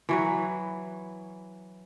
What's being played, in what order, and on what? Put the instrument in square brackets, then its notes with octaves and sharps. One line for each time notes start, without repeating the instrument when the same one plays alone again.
[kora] E3 F#3 B4